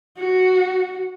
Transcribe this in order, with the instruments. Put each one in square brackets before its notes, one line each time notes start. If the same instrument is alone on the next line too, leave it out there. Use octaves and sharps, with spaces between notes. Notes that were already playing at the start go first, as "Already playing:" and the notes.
[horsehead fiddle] F#4